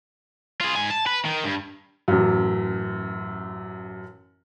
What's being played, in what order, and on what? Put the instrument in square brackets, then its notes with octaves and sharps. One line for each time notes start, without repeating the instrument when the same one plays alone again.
[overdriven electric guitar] F4 G#4
G#2 G#5
A5
B4
D#3
G2
[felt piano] A1 F#2